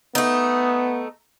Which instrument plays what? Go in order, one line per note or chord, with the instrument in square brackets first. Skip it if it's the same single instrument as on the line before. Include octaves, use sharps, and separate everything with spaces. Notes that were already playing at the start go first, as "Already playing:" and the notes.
[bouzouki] A3 D#4 [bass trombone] B3